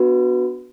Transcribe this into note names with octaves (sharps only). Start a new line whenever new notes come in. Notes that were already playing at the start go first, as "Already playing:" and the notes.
Already playing: B3 D4 F#4 B4